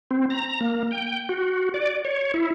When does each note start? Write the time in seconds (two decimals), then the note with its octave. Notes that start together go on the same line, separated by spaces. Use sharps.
0.11 C4
0.30 A#5
0.61 A#3
0.91 G5
1.29 F#4
1.74 D5
2.05 C#5
2.34 E4